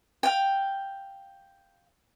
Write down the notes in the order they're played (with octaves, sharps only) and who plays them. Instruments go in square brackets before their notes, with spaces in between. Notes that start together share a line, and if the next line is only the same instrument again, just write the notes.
[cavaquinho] F5 G5